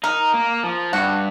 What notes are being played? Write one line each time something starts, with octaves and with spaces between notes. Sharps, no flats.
D#4 A#4
A#3
F3
G2 F#4